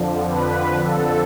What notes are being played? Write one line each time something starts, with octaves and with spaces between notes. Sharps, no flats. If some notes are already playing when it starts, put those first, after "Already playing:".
Already playing: F2 D3 F3
B4
A4